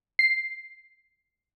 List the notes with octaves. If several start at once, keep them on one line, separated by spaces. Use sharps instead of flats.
C7